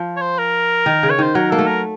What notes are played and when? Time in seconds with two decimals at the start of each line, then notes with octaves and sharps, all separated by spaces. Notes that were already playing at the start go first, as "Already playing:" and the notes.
Already playing: F3
0.17 C#5
0.22 C5
0.38 A#4
0.86 D#3
1.03 C#3
1.10 C#5
1.19 D#3 C5
1.35 F#3 A#4
1.51 A#3 A4
1.58 A3
1.67 A#4